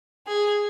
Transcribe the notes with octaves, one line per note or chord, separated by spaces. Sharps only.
G#4